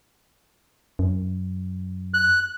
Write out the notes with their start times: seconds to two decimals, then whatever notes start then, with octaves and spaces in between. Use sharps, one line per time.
0.99 F#2
2.14 F#6